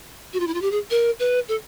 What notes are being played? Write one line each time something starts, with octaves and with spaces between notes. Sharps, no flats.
F#4
F4
E4
F4
G4
G#4
A#4
B4
A4